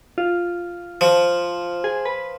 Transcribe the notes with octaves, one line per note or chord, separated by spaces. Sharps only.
F4
F3
G#4
B4